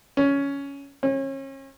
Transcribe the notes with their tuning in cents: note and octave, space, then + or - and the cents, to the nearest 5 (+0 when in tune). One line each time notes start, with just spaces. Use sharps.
C#4 +10
C#4 -35